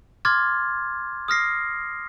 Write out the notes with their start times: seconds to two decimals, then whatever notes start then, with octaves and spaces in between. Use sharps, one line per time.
0.25 C6 D6 F6 G#6 A6
1.28 D#6 F6 A#6 C7